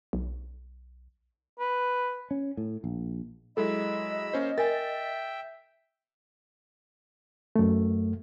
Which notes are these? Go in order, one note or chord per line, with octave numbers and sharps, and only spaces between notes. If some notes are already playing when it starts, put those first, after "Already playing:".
B1
B4
C#4
A2
A#1
F#3 G#3 E4 A4 D#5 B5 E6
A#3 C#4 C5
A#4 E5 G5 G#5 A6
F#2 A3